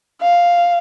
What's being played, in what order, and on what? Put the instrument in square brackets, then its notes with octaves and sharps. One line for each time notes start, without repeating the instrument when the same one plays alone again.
[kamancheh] F5